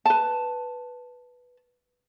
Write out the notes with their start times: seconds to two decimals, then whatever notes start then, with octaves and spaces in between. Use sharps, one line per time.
0.05 B4 A5